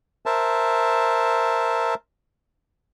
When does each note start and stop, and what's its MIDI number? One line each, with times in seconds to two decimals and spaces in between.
0.26 1.94 70
0.26 1.94 72
0.26 1.94 76
0.26 1.94 81